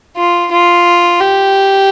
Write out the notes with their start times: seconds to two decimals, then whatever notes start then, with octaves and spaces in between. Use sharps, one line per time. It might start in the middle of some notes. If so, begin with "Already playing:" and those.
0.17 F4
0.52 F4
1.21 G4